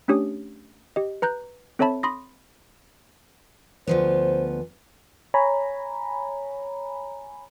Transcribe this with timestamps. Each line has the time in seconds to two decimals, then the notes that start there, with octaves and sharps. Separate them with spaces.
0.08 A3 C#4 D4 G4 C#5 D#6
0.96 G4 D#5
1.22 B4 A#5 F#6 G6
1.79 C4 A4 C#5 E5 A5 B5
2.03 B5 C6 D#6 A#6
3.87 D2 F3 B3 C5
5.34 C#5 G#5 A#5 B5